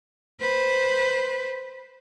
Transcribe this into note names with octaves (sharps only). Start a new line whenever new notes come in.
B4 C5